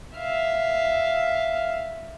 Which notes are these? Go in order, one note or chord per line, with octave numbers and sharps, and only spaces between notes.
E5 F5